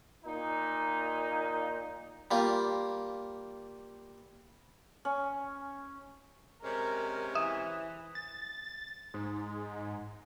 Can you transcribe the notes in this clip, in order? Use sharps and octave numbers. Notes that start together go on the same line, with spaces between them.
A#2 D#4
G3 A#3 F4
C#4
C3 G#3 C#4 A#4
E3 E5 D#6
A6
G#2